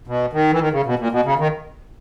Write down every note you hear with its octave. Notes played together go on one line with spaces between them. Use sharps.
B2
D#3
E3
D#3
C#3
B2
A#2
B2
C#3
D#3